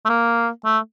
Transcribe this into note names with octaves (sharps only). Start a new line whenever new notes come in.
A3
A#3
A3